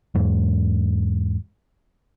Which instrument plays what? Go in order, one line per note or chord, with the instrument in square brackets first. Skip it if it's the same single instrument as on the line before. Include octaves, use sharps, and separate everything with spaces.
[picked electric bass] E2 G#2